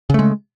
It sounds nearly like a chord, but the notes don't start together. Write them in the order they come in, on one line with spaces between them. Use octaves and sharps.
C#3 A3 G#3